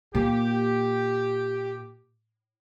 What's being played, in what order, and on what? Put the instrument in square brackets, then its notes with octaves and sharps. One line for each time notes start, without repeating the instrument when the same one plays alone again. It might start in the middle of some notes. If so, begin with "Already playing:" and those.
[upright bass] A#2 [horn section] G4